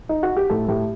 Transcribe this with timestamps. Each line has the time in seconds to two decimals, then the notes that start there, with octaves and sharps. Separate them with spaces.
0.09 D#4
0.23 F#4
0.37 G4
0.50 A2 A4
0.68 A2 G4